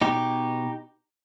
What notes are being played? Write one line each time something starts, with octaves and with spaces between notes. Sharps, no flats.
B2 D#4 G4